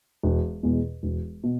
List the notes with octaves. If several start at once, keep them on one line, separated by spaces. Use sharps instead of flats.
E1
E2 B2 G#3
E1
B2